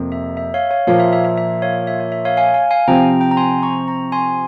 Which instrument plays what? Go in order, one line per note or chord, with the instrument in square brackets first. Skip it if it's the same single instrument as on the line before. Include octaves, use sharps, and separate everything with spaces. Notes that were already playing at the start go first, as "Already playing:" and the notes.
Already playing: [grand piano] F2 C3 A#3
[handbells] E5
E5
C#5 F5
C#5 F5
[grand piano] A#2 F3 A#3 [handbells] C#5 F5
[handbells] E5
E5
E5
E5
C#5 F5
E5
C#5
E5
C#5 F5
F5 G#5
F5 G#5
F5 G#5
[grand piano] C3 F3 C4 [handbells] G5 A#5
[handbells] G5 A#5
A#5
G#5 C6
A#5 C#6
A#5 C#6
G#5 C6